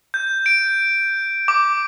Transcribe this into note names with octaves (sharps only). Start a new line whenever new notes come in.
G6
D7
D6